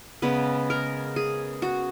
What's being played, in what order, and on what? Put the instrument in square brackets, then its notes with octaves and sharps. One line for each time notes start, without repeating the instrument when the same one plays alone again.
[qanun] C#3 G#3 B3 B4
A#4
G#4
F#4